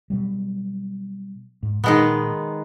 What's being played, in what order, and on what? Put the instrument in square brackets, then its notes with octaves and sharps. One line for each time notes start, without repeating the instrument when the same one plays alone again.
[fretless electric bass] B2 F#3 G3
G#2
[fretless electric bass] A#2 [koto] D#3 G#3 B3